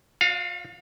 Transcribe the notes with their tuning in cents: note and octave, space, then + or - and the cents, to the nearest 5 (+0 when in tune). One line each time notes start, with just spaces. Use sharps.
F4 +45 D5 +0 F5 +0